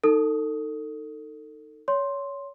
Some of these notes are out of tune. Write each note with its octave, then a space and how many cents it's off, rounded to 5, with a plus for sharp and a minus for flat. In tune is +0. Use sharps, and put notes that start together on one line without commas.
D#4 +0 A4 +30 D#6 +10
C#5 +20 C6 +5